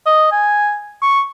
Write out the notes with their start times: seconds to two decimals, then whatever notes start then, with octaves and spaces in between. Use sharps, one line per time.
0.06 D#5
0.32 G#5
1.02 C#6